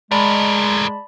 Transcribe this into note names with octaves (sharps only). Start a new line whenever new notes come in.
A2 G#3 A#4 D5 A5 B5